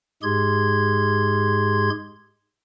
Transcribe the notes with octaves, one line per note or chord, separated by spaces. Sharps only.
G#2 G#3 G4 G#4 C6 G#6